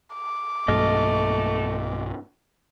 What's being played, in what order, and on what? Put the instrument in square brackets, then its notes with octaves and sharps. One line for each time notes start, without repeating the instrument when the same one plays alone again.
[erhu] D6
[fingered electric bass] B1 G2 A#3 [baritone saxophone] A3 [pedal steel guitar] D#5 F6